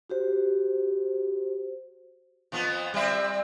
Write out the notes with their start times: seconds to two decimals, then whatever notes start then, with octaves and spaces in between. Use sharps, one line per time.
0.10 F#4 G4 C5
2.52 F2 F3 B3
2.94 G3 C4 E5